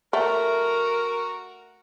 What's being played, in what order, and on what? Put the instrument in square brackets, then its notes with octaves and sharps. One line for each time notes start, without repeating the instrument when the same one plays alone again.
[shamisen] A3 [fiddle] F#4 A#5 [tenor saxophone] A#4